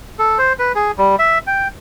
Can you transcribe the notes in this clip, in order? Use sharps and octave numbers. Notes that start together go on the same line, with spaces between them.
A4
C5
B4
G#4
G3
E5
G5